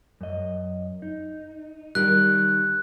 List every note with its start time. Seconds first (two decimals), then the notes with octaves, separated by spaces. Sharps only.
0.21 F#2 D#5
1.02 D#4
1.95 D#3 G3 F#6